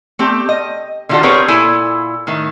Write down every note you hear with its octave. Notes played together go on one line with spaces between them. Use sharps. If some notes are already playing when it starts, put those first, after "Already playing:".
A3 C4 G4
D#5
D3 D#3 D#4 F4 F#4 A4
C4 G4 G#4 A#4 B4 C#5
A#2 E4 A4 G#5
A2 D#3